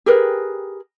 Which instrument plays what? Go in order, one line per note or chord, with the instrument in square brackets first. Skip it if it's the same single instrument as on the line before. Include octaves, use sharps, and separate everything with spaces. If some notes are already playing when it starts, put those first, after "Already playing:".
[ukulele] G4 G#4 A#4 B4